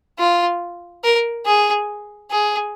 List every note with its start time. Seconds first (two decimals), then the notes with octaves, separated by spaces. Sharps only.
0.19 F4
1.04 A#4
1.46 G#4
2.31 G#4